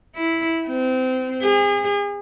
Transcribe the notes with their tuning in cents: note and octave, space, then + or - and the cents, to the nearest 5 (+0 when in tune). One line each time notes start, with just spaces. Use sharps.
E4 -5
C4 -25
G#4 -35